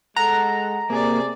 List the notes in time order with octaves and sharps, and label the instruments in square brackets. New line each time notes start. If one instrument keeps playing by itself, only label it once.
[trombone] G#3 [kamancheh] A4 [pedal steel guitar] F#5 [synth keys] A#5
[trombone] C3 [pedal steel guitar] A#3 [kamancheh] G#4 D5